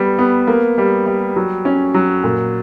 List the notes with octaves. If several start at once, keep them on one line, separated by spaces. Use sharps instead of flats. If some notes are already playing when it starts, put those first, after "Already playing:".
Already playing: G3 B3
B3
A#3
G3
G3
F#3
C#4
F#3
A#2